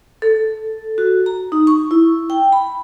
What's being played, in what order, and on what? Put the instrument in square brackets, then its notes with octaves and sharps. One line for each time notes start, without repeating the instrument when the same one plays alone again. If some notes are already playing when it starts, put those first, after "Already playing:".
[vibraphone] A4
F#4
A#5
D#4
C#6
E4
G5
B5